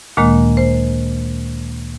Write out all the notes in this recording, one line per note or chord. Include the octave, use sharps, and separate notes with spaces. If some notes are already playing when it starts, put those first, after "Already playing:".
D2 A#2 D#3 G#3 A#3
C5